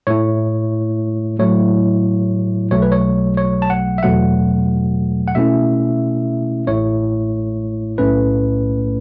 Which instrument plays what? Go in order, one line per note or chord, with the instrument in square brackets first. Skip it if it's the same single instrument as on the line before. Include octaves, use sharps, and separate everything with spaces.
[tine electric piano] A2 A3 E4 C#5
A2 F#3 A3 E4 C#5
B1 B2 F#3 A3 C#5
B4
C#5
C#5
A5
F#5
E5
E2 B2 F#3 A3 F#5
F#5
B2 A3 C#4 E4 E5
A1 A2 A3 E4 C#5
B1 A2 A3 C#4 B4